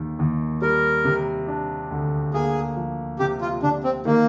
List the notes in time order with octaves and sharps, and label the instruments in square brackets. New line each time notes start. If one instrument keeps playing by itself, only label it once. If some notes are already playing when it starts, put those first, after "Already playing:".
Already playing: [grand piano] D#2 D#3
D#2
[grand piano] G3 [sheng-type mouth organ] A#4
[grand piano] C3
D4
D2
[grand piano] A#3 [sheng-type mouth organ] G#4
[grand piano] F3
[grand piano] C3 [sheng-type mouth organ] G4
[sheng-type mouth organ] F4
[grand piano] C3 [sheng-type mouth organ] D4
[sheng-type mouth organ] C4
[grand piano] D#3 [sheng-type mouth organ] A#3